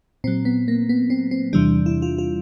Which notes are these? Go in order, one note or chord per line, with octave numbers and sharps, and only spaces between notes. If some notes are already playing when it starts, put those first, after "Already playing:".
A#2 F#3 C4
B3
A#3
B3
C4
C4
E2 C3 E3 G3 D4
E4
F4
F4